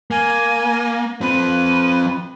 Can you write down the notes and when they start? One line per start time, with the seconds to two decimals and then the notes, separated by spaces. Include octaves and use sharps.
0.11 A#3 G#5
1.21 F3 C4 B4